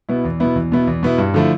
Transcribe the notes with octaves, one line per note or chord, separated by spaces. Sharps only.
B2 B3 E4
E2
B2 B3 E4
E2
B2 B3 E4
E2
B2 B3 E4
G2
D3 F3 A3 E4